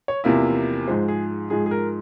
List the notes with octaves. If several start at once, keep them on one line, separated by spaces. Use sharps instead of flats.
C#5
E2 C3 F3 A#3 E4
G#2 F3 G#3 C5
G#4
G#2 F3 G#3 G#4
G#4
A#4